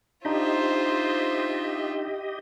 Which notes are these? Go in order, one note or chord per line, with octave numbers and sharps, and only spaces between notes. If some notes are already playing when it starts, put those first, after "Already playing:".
D4 D#4 F4 G4 C5 D#5 E5